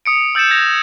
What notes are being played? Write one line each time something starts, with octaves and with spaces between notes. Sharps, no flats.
D#6 C#7 D7
E6 G6 A6 C#7 E7
G#6 A#6 F7